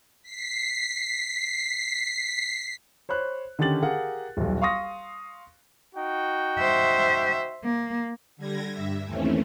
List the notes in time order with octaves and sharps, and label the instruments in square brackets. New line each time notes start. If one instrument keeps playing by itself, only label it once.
[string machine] B6 C7
[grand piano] C5 C#5 B5 F#6
D3 D#3 C#4 G4 A6 F#7
G4 G#4 A#4 F5 F#5
D#1 B1
F5 C6 C#6 D#6 A#6
[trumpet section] D#4 F#4 G5
[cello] C5 E5
A#3
[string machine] D3 G3 G#6 A#6
G2 E5
D#2 E3 A3 C4 C#4